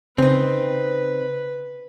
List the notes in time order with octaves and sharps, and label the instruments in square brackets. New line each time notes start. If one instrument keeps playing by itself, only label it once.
[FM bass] C#3 [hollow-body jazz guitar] C4 D#4 [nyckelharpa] B4